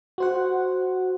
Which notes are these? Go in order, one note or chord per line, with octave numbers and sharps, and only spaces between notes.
F#4 C5 F#5